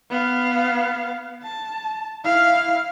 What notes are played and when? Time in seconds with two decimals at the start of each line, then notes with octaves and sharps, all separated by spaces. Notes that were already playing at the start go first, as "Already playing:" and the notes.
0.10 B3 F5
1.42 A5
2.24 E4 F5